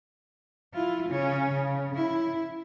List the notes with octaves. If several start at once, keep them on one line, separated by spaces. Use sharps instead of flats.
E4 F4
C#3 C#4
C#3
E4